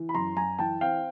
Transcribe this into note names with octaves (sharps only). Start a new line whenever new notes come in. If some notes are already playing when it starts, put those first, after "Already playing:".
Already playing: E3
B5
F#2 A#5 C6
F#2 G#5 A#5
E3 G5 A5
C4 F5 G5